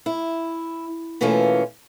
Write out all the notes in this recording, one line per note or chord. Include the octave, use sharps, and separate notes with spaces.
E4
B2 E3 A3 A#3 C#4 F4